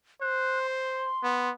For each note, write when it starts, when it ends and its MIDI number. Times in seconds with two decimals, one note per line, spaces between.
0.21 1.10 72
0.21 0.59 90
0.67 1.50 84
1.23 1.51 59